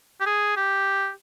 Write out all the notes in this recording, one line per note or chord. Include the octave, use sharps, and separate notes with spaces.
G4
G#4
G4